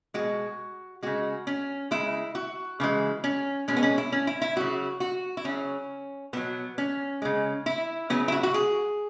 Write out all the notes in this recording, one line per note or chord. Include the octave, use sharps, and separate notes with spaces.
B2 G#3 F#4
C#3 G#3 F#4
C#4
C#3 G#3 E4
F#4
C#3 E3 G#3
C#4
B2 G#3 C#4
B3
C#4
E4
C#4
E4
E4
C#3 F#3 F#4
F#4
E4
C#3 F#3 C#4
B2 F#3 B3
C#4
C#3 G#3
E4
C#3 F#3 B3
E4
F#4
F#4
G#4